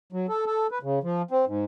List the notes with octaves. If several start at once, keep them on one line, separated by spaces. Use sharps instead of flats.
F#3
A4
A4
B4
C#3
F3
C4
G#2